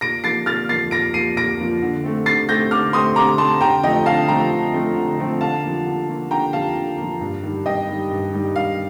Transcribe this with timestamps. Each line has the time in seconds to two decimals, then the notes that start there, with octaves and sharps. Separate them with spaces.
0.01 A#2 A#6 D7
0.24 F3 A#3 A6 C7
0.46 A#2 F6 A6
0.69 F3 A#3 A6 C7
0.91 A#2 A#6 D7
1.14 F3 A#3 C7 D#7
1.36 A#2 A#6 D7
1.59 F3 A#3
1.82 D3
2.04 A3 C4
2.26 D3 A6 C7
2.48 A3 C4 G6 A#6
2.71 D3 D6 F6
2.93 A3 C4 C6 D#6
3.16 D3 A#5 D6
3.38 A3 C4 A5 C6
3.61 D3 G5 A#5
3.83 F3 A3 C4 D#5 G5
4.06 D3 F5 A5
4.28 F3 A3 C4 G5 A#5
4.52 D3
4.74 F3 A3 C4
4.96 D3
5.19 F3 A3 C4
5.40 D3 F5 A5
5.63 F3 A#3
5.86 D3
6.08 F3 A#3
6.31 D3 G5 A#5
6.53 F3 A#3 F5 A5
6.75 D3
6.98 F3 A#3
7.21 G2
7.43 D#3 G3
7.66 G2 D#5 G5
7.88 D#3 G3
8.11 G2
8.33 D#3 G3
8.55 G2 F5